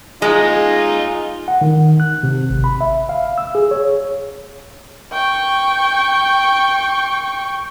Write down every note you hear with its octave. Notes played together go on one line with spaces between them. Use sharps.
G#3 D#4 F4
F#5
D#3
F#6
C3
G#1
B5
E5
F5
E6
G#4
C#5
G5 C#6